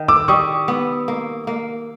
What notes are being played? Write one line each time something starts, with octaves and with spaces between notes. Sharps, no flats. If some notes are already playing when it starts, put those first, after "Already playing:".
Already playing: D#3
D6 E6
G3 C#6 D#6
B3
A#3
A#3